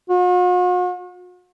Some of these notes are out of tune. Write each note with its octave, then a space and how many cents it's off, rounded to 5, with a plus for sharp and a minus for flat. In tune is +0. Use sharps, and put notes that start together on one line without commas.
F#4 -45